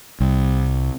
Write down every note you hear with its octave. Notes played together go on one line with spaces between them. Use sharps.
C2